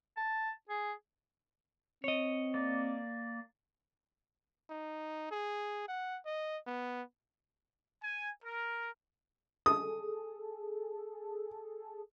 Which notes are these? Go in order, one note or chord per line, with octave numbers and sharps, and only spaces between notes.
A5
G#4
C4 C#5 D#5
A#3 D5
D#4
G#4
F#5
D#5
B3
G#5
A#4
G#4 A4 D#6